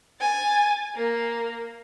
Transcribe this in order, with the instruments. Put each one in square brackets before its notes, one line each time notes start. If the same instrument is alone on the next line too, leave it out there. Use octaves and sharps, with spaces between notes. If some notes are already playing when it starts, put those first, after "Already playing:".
[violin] G#5 A6
A#3